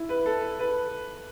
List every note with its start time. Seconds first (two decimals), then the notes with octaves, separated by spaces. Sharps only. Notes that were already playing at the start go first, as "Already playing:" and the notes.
Already playing: E4
0.09 B4
0.26 A4
0.59 B4